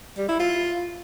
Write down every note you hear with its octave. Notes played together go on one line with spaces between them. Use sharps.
G3
E4
F4